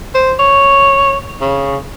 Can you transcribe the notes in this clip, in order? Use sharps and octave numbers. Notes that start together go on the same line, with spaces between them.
C5
C#5
C#3